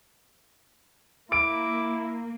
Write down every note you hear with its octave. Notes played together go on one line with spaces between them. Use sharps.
A#3 E4 D6 D7